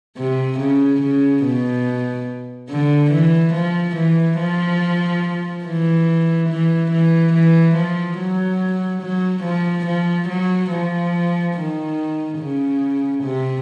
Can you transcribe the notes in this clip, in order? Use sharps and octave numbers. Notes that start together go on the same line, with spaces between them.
C3
C#3
C#3
B2
D3
E3
F3
E3
F3
E3
E3
E3
E3
F3
F#3
F#3
F3
F3
F#3
F3
D#3
C#3
C3